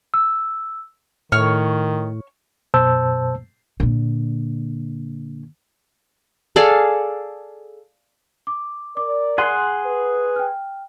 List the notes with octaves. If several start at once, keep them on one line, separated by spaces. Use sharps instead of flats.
E6
A2 D#3 C#5 F6
F#2 B2 C5 A5 E6 G6
A#2 D3
G#4 A4 D5 F5
D6
A#4 D5 D6
G#4 F#5 C6 C7 D#7
B4
G5 F6